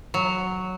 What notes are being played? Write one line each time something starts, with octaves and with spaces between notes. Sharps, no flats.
F#3